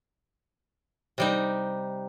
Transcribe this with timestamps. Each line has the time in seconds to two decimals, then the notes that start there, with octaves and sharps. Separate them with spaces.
1.18 C3 G3 D#4